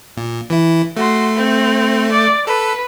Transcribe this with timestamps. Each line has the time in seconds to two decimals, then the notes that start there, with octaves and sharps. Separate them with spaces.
0.17 A#2
0.50 E3 E4
0.97 A3 F#4 C6
1.36 C4
2.12 D5
2.47 A4 B4